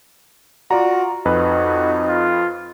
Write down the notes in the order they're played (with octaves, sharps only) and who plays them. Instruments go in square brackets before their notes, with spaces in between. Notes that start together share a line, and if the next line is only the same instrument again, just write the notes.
[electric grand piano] F4 D5 A#5 [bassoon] F#4
[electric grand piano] F2 B4 [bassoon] D#4 [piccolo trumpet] F#4
[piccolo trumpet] F4